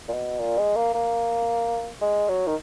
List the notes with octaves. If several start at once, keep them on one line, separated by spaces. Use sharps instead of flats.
A#2
B2
A#2
G#3
A#3
A#3
G#3
F#3
D#3